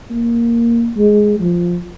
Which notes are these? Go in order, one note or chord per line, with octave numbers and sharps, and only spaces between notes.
A#3
G#3
F3